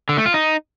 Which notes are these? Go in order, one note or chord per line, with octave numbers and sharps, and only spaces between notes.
D3
A3
F4
D#4